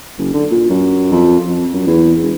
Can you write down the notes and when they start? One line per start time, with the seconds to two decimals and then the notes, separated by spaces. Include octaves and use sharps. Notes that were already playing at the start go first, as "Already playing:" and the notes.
0.18 F#1
0.33 D3
0.51 A#2
0.70 F#2
1.12 F2
1.48 F2
1.73 F#2
1.87 E2
2.22 E1